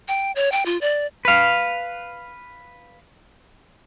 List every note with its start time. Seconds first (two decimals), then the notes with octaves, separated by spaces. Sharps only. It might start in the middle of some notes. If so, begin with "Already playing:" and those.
0.08 G5
0.36 C#5
0.52 G5
0.66 F4
0.81 D5
1.25 B4 F5